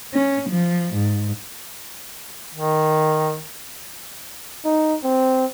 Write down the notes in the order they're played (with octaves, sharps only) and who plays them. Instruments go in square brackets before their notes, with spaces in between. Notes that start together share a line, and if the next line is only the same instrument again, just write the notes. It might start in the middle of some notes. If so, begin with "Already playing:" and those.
[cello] C#4
F3
G#2
[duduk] D#3
[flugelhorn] D#4
C4